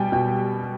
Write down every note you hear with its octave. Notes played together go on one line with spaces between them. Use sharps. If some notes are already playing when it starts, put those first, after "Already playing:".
Already playing: B2 G3 G5 G#5
B2 G5